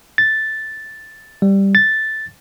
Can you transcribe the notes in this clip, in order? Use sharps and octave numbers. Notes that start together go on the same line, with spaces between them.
A6
G3
A6